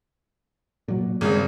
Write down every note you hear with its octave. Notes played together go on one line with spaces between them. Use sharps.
A#2 F#3
G#1 G2 C#3 G#3